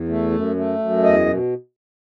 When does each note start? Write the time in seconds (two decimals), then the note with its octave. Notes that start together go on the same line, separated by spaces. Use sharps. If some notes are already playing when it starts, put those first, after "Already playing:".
Already playing: E2
0.09 A3
0.32 F#2
0.56 A3
0.79 F#2
1.03 E2 D#5
1.26 B2